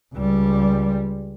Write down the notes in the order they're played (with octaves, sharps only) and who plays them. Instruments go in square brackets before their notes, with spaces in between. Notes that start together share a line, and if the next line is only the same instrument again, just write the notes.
[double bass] C#2 G3